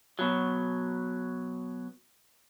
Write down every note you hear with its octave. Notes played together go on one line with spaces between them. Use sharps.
B2 F#3